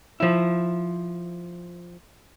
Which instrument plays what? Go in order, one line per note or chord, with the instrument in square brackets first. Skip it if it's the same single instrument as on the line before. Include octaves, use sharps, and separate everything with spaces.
[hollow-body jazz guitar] F3 E4